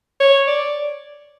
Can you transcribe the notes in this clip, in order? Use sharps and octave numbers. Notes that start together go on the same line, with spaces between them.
C#5
D5